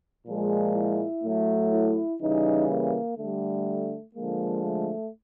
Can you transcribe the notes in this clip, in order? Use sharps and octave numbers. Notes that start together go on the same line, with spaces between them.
A#2 F3 G#3
E4
A2 F#3 A3
E4
C#3 E3 G3 D#4
A#3
D3 G3 A3
D3 F3 G#3 A#3
A3